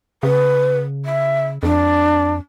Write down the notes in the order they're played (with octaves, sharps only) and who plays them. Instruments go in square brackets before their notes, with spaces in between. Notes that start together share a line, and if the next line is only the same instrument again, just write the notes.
[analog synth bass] C#3 [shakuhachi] B4
[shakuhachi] E5
[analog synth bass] F2 [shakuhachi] D4